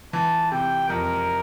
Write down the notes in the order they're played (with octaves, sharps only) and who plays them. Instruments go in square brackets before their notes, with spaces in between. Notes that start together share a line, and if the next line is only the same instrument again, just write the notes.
[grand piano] E3 [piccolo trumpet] A5
[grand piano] C3 [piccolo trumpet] G5
[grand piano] F2 [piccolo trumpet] A#4